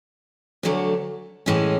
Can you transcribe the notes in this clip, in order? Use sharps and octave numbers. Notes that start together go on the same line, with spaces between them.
D2 D3 F#3 A3
A2 E3 G#3 C#4